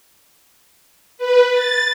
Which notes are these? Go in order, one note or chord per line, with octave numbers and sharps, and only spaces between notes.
B4
A6